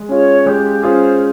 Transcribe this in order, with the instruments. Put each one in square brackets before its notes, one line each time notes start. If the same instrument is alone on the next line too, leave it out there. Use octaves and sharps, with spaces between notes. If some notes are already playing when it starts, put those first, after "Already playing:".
Already playing: [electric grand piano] G#3
[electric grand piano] C#4 F4 G#4 [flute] C#5
[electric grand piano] G#3 [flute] G4
[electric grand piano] C#4 F4 G#4 [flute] C5